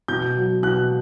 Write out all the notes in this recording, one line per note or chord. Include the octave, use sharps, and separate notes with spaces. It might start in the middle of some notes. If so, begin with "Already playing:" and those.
B2 G6
F#3
B2 F#6